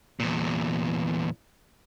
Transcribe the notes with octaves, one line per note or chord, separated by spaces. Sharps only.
E2 A#2